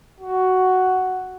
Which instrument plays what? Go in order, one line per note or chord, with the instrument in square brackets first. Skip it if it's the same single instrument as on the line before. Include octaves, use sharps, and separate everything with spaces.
[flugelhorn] F#4